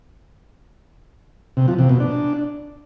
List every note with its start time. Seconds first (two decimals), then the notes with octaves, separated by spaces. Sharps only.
1.57 C3
1.68 F3
1.79 C3
1.89 B2
2.00 D4